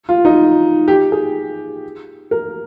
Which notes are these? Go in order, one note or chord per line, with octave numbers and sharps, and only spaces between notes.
F4
D#4
G4
G#4
A#4